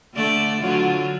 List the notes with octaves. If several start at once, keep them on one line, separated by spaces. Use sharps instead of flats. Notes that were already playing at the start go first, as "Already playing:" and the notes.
D3 A3 D5
D3 F#3 F4